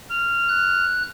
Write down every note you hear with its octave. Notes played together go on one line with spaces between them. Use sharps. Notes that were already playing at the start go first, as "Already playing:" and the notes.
F6
F#6